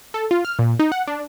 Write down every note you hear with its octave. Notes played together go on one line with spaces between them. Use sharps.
A4
F4
F6
A#2
D#4
F#5
D4